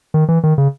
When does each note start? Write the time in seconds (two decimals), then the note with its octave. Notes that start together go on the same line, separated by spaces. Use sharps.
0.14 D#3
0.29 E3
0.44 D#3
0.58 C#3